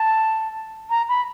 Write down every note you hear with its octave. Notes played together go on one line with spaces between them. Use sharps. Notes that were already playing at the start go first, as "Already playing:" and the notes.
Already playing: A5
A#5
B5